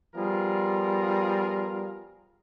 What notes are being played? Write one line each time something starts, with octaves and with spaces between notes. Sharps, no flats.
F3 G3 B3 F4 G#4 A#4